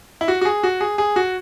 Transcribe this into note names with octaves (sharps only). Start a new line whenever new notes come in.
E4
F#4
F#4
G#4
F#4
G#4
G#4
F#4